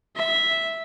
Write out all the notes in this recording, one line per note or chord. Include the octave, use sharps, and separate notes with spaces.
E5